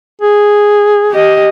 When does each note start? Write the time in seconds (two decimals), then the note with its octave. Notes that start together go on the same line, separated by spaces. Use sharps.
0.21 G#4
1.11 G4 D#5